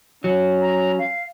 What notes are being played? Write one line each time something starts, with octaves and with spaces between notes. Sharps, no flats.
F#3 C#4
A#5
F5